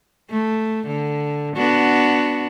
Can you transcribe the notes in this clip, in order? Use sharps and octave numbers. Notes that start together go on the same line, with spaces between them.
A3
D3
B3 D4 F#4